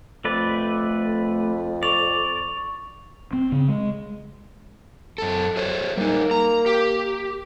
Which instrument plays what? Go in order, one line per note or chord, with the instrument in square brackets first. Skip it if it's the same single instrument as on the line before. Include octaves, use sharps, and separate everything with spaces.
[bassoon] F2 [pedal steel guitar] A3 B4 D5
[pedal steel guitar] D5 [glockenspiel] C#6 F7
[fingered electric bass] C4
C#3
G#3
[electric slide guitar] F#2 A4
G#4 C5 C#5
[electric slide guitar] G3 D#4 [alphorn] A#3
[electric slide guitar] A#5
G4